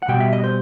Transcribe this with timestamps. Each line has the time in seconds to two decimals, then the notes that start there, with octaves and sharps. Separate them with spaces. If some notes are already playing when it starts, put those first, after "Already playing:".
0.02 F#5
0.08 B2 G3 G5
0.20 E5
0.33 D#5
0.44 C5